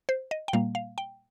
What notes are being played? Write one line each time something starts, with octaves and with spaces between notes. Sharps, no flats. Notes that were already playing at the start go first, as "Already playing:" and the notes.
C5
D#5
G5
A#2 G3 A#3 F5
F5
G5